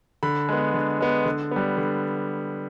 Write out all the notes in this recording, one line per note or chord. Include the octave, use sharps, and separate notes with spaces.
D3 B5
G#3 B3
D3
G#3 B3
D3
G3 B3
D3